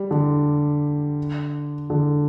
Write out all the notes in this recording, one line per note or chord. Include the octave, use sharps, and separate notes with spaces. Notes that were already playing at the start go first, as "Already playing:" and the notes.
Already playing: G3
D3
D3